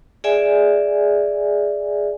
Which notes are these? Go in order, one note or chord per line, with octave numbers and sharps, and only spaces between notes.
G#4 D5 E5 G#5